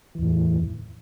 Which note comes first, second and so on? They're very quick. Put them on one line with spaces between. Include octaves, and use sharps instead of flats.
E3 E2 A2